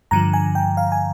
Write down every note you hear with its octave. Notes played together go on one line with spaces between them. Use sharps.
G2 D3 F3 A#5
G#5
G5
F5
G#5